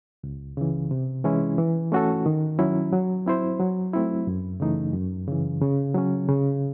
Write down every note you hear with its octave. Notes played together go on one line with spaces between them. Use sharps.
C#2
C#3 E3
C3
E3 G#3 C#4 E4
E3
A3 C#4 F#4 A4
D#3
F#3 C#4 E4
F#3
C4 E4 C5
F#3
A3 C4 E4
F#2
C#3 E3 A3 D#4
F#2
C#3 E3
C#3
F#3 C#4
C#3